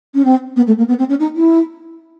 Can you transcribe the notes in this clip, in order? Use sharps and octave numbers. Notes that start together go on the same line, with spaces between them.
C#4
C4
B3
A3
A#3
B3
C4
C#4
D#4
E4